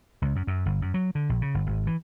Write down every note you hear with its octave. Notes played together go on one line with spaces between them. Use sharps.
C#2
F#2
F#2
G1
F#2
F#3
D3
A#1
C#3
G1
G#1
E3